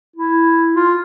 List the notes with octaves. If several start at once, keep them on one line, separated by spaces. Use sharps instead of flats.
E4
F4